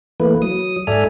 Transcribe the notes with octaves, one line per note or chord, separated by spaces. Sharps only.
E3 A3 A#3 B4
F#3 D#6
G#2 A4 D5 E5 G#5 F6